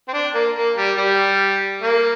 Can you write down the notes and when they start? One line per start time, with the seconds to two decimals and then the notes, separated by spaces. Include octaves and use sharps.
0.08 C4
0.13 D4
0.34 A#3
0.56 A#3
0.77 G3
0.97 G3
1.82 A#3